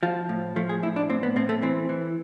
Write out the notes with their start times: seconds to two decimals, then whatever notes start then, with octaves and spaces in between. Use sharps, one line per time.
0.03 F3 F4
0.29 A2
0.56 F3 A3
0.69 G#4
0.83 A2 E4
0.96 D4
1.10 A2 C4
1.23 B3
1.36 A2 C4
1.49 A3
1.62 E3 C4
1.89 E3